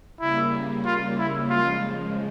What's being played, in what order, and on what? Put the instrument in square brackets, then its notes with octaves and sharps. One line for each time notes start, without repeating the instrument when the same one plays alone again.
[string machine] C#3 G3 A#3 [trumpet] E4
[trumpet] F4
E4
[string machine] C#3 F3 G#3 [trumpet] F4